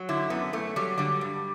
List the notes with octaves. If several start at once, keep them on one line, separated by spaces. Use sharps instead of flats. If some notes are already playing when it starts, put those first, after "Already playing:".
Already playing: F#3
D3 E4
F#2 B3
F#2 A3
F#3 G3
D3 G3
G2